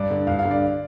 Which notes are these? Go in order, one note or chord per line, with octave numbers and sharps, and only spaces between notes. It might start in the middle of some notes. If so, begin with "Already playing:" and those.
Already playing: G2 D5
D3
G2 F5
F5
D3
D5